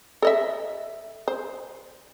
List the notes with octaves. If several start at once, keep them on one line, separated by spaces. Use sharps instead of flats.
A4 D#5 E5
C5